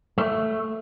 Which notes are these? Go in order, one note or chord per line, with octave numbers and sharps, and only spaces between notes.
A3